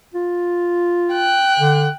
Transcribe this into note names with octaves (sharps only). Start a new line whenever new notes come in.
F4
G5 F#6
D3